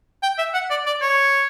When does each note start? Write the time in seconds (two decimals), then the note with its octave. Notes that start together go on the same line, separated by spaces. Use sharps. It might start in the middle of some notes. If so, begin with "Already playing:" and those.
0.23 G5
0.38 E5
0.54 F#5
0.70 D5
0.86 D5
1.01 C#5